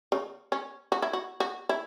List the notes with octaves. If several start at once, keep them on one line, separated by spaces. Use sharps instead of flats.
C#3
C#4
F#4
E4
F#4
F#4
E4